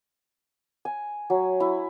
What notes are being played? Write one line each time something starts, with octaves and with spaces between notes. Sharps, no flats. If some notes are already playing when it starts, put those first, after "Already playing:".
G#5
F#3
E4